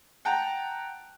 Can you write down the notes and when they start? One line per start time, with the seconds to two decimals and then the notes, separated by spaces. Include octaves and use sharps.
0.25 F#5 G5 A5 A#5